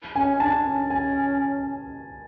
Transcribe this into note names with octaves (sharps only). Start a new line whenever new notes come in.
C#4 G#5
D4 A5
C#4
G#5